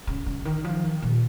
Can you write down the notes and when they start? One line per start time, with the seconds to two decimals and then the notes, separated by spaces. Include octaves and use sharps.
0.07 C#3
0.26 C#3
0.45 D#3
0.64 F3
0.84 D#3
1.02 A#2